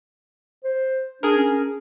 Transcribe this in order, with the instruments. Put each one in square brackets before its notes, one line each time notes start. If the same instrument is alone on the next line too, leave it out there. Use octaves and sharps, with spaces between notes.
[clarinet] C5
[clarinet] D4 [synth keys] G#4 A#4
[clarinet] C#4